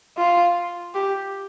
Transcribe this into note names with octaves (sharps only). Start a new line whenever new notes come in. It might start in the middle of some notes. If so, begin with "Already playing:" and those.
F4
G4